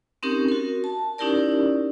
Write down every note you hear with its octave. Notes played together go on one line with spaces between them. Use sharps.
C4 C#4 D#4 G4 A#4 C#6
F#4 A#4
A5
C#4 D#4 E4 G4 A#4 D5